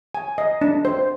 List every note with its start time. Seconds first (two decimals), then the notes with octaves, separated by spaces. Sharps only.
0.15 G#5
0.38 D#5
0.61 D4
0.85 C5